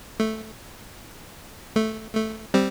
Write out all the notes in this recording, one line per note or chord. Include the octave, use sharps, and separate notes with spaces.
A3
A3
A3
G3 C4